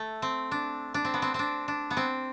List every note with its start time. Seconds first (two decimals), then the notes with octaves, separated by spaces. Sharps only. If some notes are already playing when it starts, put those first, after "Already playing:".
Already playing: A3
0.22 C4
0.51 D4
0.94 D4
1.05 C4
1.14 B3
1.22 C4
1.34 C4 D4
1.68 D4
1.91 B3
1.97 C4